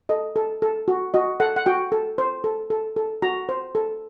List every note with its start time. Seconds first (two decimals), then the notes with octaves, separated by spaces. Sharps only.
0.09 A4 D#5
0.36 A4
0.62 A4
0.88 F#4
1.14 F#4 D#5
1.40 A4 F#5
1.56 F#5
1.66 F#4 G5
1.92 A4
2.18 C5
2.44 A4
2.70 A4
2.96 A4
3.22 F#4 A#5
3.49 C5
3.75 A4